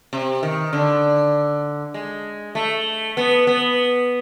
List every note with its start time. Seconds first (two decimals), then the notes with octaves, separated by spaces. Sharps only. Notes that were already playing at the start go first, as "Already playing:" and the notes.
0.13 C3
0.43 D#3
0.73 D3
1.94 G#3
2.55 A3
3.17 B3
3.47 B3